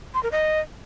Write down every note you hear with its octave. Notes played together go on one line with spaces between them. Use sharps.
C6
A#4
D#5